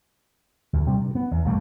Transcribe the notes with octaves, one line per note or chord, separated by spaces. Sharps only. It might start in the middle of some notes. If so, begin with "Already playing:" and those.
D2
C3 G3 C4
G2
B3
E2
B1 G2 A3 A#3